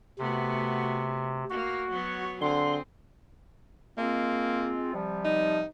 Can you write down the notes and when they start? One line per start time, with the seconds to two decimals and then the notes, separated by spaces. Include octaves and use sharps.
0.19 C3 A3 B3 F#4
1.50 A#3 F#4
1.91 F#3 B3 C#5
2.41 D3 C4 G#4 C6
3.98 G#3 A#3 C4 F4
4.94 C3 F3 G3
5.24 D#4